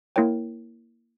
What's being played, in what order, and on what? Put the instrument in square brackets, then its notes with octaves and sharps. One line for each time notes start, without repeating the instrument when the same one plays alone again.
[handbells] A#3 E4 A#4 C#5 G5